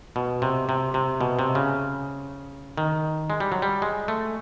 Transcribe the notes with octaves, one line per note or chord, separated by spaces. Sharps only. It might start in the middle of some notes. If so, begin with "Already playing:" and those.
B2
C3
C3
C3
B2
C3
C#3
D#3
G#3
G3
F#3
G3
G#3
A3